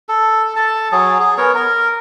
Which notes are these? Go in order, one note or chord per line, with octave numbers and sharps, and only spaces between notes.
A4
A4 A5
F#3 G#4
G#4
B3 A#4 C#5
A#4